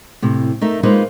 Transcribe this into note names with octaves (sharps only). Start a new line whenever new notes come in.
A2 C3
A3 D#4 A#4 E5
G#3 A#3 D#4 F4 B4 C5